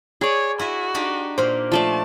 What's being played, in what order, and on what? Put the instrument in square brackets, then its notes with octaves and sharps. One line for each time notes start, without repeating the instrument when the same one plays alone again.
[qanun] G#4 D5 [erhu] C#5
[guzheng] E4 D#5 E5 [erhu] F#4
[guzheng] D4 D#4 G4
[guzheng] A#2 A#3 [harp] C5
[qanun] F3 A3 D5 [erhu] A5